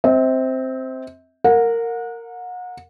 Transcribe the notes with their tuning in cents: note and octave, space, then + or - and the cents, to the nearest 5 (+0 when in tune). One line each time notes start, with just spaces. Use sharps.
C4 +0 E5 -40
A#4 -15 F#5 -35